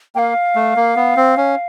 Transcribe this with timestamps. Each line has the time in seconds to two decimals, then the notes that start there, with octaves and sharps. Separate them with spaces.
0.15 A#3 F5 G5
0.56 A3
0.76 A#3
0.96 B3
1.17 C4
1.37 C#4